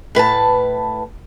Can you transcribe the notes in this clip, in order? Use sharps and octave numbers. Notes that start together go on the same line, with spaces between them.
A2 B4 G#5 A5